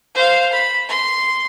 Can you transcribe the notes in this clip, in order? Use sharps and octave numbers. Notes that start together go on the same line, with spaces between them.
C5 F5
B5
C6